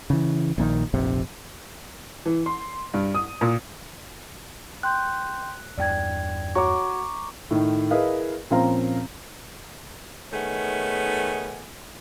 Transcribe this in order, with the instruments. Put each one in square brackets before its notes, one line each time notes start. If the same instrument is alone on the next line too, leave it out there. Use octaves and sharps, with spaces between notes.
[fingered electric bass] C#3 E3
A#1 A#2 D3 D#3
F1 A#1 C3
[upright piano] E3
C6
G2
D#6
A#2
[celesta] G5 C6 G6 [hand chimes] F#6
[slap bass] E2 G2 [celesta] D5 G5 G#6
[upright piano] F#4 C#5 [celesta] A#5 [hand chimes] C#6 D6
[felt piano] A2 D#3
E4 G#4 A#4 B4 D#5 F5
A#2 F3 C4 C#4 F5 A#5
[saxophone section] D#3 A3 B3 C#4 D#4 G#4